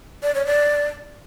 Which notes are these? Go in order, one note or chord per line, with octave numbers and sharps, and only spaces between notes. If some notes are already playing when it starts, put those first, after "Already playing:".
D5
C#5
D5